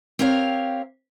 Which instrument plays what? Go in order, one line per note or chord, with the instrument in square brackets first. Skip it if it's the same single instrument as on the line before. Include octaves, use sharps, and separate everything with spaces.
[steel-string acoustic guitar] C4 G4 A#4 C#5 F5